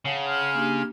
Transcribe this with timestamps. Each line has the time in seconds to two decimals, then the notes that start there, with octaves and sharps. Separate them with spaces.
0.05 C#3 C#5 F#5 A5
0.26 C6 F6 G#6
0.55 A#3 D4 G4